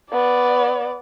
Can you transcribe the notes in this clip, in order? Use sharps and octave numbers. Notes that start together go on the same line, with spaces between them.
B3 D5